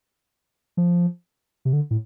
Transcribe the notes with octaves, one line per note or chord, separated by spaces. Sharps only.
F3
C3
D3
A2